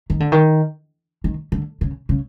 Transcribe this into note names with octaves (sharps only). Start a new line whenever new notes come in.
D#3
D3
D#3
D#3
D3
C#3
C#3